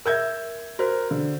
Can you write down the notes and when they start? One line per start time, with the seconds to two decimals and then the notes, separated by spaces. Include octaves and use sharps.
0.06 A#4 E5 E6 G6 G#6
0.79 F#4 A#4 C5
1.11 D3